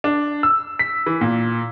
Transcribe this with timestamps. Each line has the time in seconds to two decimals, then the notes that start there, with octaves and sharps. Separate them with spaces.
0.04 D4
0.43 E6
0.79 B6
1.06 E3
1.21 A#2